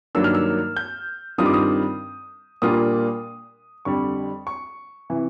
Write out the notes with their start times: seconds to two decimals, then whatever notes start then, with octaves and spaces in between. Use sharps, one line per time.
0.15 G2 D#3 F#3 A#3 D4 E6
0.24 F6
0.35 E6
0.77 G6
1.38 G2 D#3 G3 C4 F4 D#6
1.46 D6
1.54 D#6
2.62 A#2 G3 A#3 D4 F4 D#6
3.85 F2 D3 G3 C#6
4.47 C#6
5.10 C3 E3